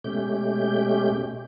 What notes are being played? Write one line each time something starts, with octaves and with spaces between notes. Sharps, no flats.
B2 G#3 A3 C#4 G4 G6